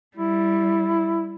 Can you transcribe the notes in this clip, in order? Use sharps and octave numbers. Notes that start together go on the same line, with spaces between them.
G3 E4